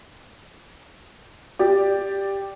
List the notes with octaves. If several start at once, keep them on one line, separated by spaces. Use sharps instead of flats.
G4 D5